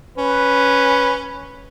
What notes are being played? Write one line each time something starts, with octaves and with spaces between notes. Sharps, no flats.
C#4 B4